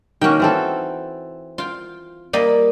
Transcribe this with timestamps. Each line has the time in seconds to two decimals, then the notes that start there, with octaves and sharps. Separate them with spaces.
0.21 D#3 A#3 C#4 F#4 G5
0.40 E3 C4 A4
1.58 F4 G5
2.33 G3 A#3 D#5